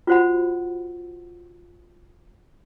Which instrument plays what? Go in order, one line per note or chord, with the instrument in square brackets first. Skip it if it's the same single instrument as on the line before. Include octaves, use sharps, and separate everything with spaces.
[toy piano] F4 F#4 C5 F#5 B5